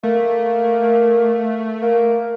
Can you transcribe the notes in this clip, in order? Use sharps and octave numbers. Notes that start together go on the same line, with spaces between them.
A3 A#3
A#3